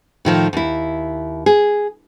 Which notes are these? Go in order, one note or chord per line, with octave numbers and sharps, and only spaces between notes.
A2 D#3 F3
D#2 E4
G#4